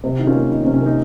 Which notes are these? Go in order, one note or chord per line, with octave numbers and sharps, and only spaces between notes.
C3
D#3 D#4
C#4 F4
A#3
D#3 D#4
C#4
C3
C#4
A#3 D#4